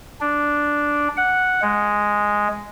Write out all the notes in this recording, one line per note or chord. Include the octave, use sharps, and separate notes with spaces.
D4
F#5
G#3